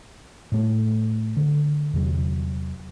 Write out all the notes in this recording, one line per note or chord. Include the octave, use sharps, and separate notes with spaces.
A2 A3
D3
E2 C3 F#3